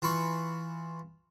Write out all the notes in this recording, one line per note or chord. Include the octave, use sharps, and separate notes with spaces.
E3 F4 B5 C#6